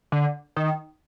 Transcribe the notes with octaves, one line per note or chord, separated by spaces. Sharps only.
D3
D#3